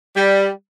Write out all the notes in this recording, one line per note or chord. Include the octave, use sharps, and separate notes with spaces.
G3